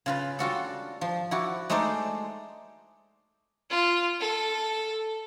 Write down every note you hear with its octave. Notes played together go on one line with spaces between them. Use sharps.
C#3 F4 B4
G3 F4 F#4 A4
F3
E4 F#4 D5
G#3 A3 D#4 C5 D5 D#5
F4
A4